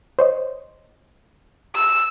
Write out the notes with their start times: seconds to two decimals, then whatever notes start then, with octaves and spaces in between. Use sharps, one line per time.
0.19 C5 C#5 D#5
1.76 E6